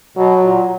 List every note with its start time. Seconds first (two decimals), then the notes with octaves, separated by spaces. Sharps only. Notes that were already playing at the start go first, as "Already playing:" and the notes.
0.17 B2 F#3
0.43 A#2